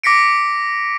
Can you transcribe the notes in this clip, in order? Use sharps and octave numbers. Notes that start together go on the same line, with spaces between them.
D6 A#6 B6 C#7 D7